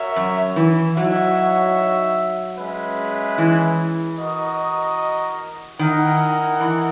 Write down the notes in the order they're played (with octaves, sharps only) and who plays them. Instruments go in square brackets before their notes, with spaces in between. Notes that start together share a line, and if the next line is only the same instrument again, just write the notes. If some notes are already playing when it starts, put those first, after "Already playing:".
Already playing: [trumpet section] F#4 A#4 C#5 E5
[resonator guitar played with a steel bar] F#2
E3
[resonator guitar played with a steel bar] F#3 [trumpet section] D#4 F#4 C#5 E5
[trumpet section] G#3 C#4 G#4 B4 E5
[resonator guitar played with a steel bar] E3
[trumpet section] F#4 A#4 D#5
[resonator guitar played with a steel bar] D#3 [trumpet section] E4 A#4 D#5 F#5
[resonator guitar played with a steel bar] E3